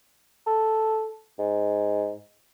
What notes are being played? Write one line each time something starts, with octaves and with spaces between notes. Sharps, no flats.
A4
G#2